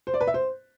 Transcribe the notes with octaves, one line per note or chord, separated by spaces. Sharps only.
C5
D5
B4
E5
C5